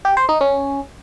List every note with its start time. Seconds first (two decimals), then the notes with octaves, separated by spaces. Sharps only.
0.05 G4
0.17 C5
0.29 D#4
0.41 C#4